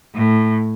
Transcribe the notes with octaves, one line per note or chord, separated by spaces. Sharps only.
A2